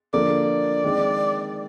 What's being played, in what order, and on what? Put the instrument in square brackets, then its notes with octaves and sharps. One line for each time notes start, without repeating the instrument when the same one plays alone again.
[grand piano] D3 F3 A#3 [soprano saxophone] D5
[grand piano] D#3 G#3 C4